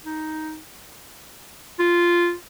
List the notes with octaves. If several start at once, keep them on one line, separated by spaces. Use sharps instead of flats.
D#4
F4